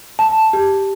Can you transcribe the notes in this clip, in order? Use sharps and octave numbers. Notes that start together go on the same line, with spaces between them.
A5
G4